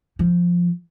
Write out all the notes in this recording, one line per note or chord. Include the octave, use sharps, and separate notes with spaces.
F3